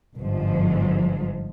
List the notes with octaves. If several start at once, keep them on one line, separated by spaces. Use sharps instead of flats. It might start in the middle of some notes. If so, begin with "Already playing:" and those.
G1 G#2 F3